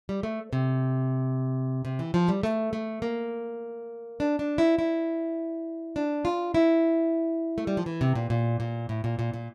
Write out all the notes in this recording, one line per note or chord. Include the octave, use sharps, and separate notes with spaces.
G3
A3
C3
C3
E3
F3
G3
A3
A3
A#3
D4
D4
E4
E4
D4
F4
E4
A3
G3
F3
E3
C3
A#2
A#2
A#2
A2
A#2
A#2
A#2